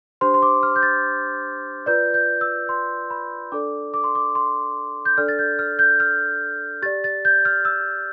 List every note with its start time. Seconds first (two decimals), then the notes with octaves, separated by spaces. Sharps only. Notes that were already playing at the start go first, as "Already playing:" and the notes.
0.21 D4 G4 C5 C6
0.34 C6
0.42 D6
0.63 F6
0.76 G6
0.83 A6
1.86 F4 B4 D5 G6
2.14 G6
2.41 E6
2.69 C6
3.10 B5
3.52 D4 A4 D5 D6
3.94 D6
4.04 C6
4.15 D6
4.35 C6
5.05 G6
5.18 D4 A4 D5 F6
5.28 A6
5.39 G6
5.59 F6
5.79 G6
6.00 F6
6.82 G4 A6
6.86 D5
7.04 A6
7.25 G6
7.45 F6
7.65 E6